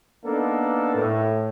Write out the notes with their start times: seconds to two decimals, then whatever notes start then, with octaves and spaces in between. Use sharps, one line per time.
0.25 A#3 B3 D4 D#4 A4
0.95 A2